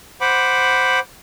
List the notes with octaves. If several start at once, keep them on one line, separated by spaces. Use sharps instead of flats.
C5 F#5 B5 D6